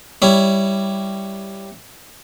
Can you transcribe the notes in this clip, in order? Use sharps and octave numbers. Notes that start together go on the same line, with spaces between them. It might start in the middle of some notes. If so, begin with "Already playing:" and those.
G3 E4 C#5